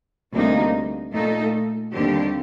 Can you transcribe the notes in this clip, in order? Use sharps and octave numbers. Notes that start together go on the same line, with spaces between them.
D2 C3 G3 A#3 D#4
A#2 A3 D#4 A4
D#2 D3 G3 C4 G4